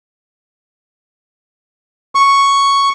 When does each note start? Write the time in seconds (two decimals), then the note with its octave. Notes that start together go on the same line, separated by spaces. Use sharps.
2.15 C#6